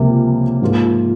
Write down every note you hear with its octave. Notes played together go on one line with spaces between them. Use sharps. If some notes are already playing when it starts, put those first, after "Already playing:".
Already playing: C#2 C3 F3 A#3
G#2 F3 A#3 F4